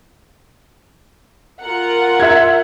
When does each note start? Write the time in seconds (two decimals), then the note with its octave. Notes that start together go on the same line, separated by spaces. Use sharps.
1.62 F4 A#4 F#5
2.20 E5 G#6